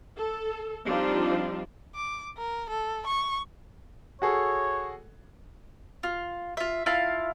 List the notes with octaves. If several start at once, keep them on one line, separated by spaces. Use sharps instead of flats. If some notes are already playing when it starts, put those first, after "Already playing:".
A4
F3 G3 C4 D4 D#4 F4
D6
A#4
A4
C#6
F#4 G#4 A4 C#5
F4
F4 E5
E4 F4 F5 A5